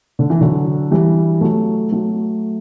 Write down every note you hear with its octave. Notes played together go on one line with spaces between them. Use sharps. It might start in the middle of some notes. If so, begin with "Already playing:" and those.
D3
E3
D3 F#3
E3 G3
F#3 A3
F#3 A3